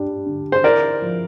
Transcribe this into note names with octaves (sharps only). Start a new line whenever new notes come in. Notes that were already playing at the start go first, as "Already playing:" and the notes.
Already playing: G3 D4
D3
C5
E4 A#4 D5
F3